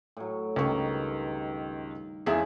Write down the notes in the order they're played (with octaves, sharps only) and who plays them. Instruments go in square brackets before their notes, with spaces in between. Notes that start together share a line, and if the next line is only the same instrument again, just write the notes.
[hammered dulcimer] A2 F#3
[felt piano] C#2 C#6 [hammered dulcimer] G2 D#3
[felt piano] E2 G#4 E5 [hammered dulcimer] C#3 G#3